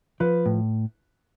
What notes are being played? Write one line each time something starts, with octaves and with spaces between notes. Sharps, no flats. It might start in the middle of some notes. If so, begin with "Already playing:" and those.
F3 B4
A2